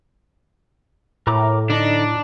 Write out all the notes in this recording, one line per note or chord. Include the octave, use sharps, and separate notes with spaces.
A2 A#4 A#5 D6
D3 D4 D#4 D#5